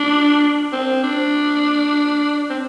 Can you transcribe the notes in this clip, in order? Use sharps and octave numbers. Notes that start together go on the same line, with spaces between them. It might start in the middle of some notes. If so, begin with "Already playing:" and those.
Already playing: D4
C4
D4
C4